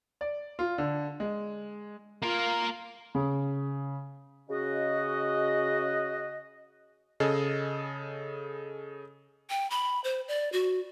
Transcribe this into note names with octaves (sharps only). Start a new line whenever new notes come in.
D5
F4
D3
G#3
A#3 F4 A#4
C#3
C#3 F#4 D#5
C#3 G#4 A4 D#5
G5
B5
C5
D5
F#4